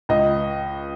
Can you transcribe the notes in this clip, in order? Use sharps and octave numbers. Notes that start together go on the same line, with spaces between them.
C#2 D#5